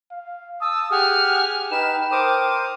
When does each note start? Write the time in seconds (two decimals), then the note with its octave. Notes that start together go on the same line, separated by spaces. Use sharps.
0.12 F5
0.61 A5 D#6 E6
0.91 G4 G#4 F#5 G#5 F6
1.72 D#4 B4 G5 E7
2.11 A#4 C5 D6 D#6